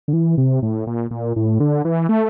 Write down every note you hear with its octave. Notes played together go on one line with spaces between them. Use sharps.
D3
E3
C3
A2
A#2
A#2
A2
D3
E3
A3